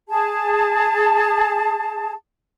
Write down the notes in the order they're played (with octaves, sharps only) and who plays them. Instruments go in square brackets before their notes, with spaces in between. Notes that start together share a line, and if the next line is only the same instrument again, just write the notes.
[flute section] G#4 A5